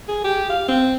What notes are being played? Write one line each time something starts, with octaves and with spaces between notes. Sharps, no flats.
G#4
G4
F5
C4